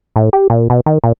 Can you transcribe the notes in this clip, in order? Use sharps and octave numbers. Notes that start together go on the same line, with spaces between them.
A2
G4
A#2
B2
D#3
A#2